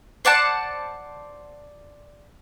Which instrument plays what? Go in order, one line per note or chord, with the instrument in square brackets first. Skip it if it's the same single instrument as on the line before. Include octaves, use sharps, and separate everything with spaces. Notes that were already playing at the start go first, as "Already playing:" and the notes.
[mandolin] C5 D5 F#5 A5